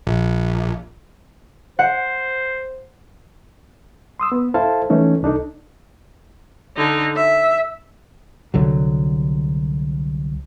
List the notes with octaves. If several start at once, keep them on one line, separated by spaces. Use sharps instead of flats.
A#1
C5 F#5
C6 D#6 E6
B3
E4 A4 C5 F5 A5
E3 A3 C#4 D#4
C2 D4 D#4 A4
D3 D#4
E5
C2 D3 F#3